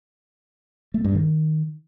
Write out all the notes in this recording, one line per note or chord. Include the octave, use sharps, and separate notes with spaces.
A3
G2
D#3